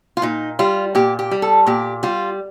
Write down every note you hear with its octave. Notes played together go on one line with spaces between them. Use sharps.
F4
A#2 D#4
G3 F4
A#2 G4
G4
G3
A4
A#2 G4
G3 F4